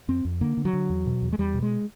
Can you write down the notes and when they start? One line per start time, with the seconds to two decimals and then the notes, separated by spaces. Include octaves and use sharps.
0.08 F2 C4
0.25 F2
0.41 D3 A#3
0.57 D3
0.65 F#3
0.73 D3
0.90 E2
1.06 B2
1.22 E2
1.33 G#3
1.38 E2 G3
1.54 B2
1.62 G#3